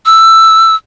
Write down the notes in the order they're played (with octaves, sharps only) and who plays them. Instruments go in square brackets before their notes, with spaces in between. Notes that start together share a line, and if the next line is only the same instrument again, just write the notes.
[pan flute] E6